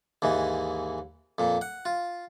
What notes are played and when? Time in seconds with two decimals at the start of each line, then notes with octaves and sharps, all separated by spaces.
0.22 D#2 G#2 E3
1.38 F2 A#2
1.61 F#5
1.85 F4